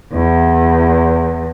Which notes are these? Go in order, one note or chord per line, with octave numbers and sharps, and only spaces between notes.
E2